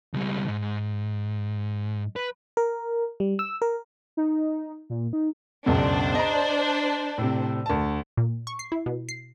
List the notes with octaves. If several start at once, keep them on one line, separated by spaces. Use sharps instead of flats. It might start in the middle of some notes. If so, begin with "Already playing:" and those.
C#2 G3
C2 G#2
B4
A#4
G3
E6
A#4
D#4
A#2
D#4
C#2 F#2 B2 D4 C5
D#5 A#5
A2 C3
D2 A5
A#2
C#6
C7
E4
B2
C7